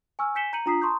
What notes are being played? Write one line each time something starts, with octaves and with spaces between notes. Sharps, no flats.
G#5 C#6 E6 F6
G#5 G6 B6 C#7 E7 G7
A#5 G6 C#7 D#7 F#7
D4 F4 A#5 D#6 B6 C7
A5 A#5 C6 C#6 D#6 G6